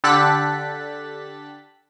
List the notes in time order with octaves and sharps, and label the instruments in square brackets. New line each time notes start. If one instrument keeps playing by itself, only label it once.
[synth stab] D3 G4 A4 F#6 A6 B6